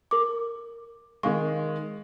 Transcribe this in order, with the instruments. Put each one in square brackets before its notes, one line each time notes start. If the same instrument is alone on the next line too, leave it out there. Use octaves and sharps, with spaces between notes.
[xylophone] A#4 D6
[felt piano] D#3 G#3 [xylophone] F5 C#6